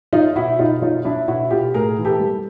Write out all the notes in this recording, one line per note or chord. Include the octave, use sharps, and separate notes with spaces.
F#3 D#4 F4
B2 E4 F#4
B2 D#4 F4
F#3 D#4 F4
F#3 D4 E4
B2 E4 F#4
B2 F4 G4
A2 G#4 A#4
E3
G4 A4
G3